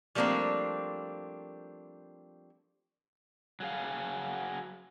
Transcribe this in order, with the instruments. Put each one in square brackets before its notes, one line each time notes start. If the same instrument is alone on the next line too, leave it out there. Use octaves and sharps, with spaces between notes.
[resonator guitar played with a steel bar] F3 G3 A3 A#3 C4 D4
[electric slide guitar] F#3 G#4 F5